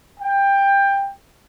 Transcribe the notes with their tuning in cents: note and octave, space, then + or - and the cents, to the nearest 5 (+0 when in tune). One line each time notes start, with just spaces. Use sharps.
G5 +15